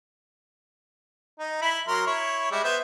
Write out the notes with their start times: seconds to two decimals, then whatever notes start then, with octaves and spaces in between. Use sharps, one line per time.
1.39 D#4
1.62 E4 B5
1.88 F#3 A#4 C6
2.06 E4 C#5
2.52 G3 G#3 E5
2.64 B3 C5 E5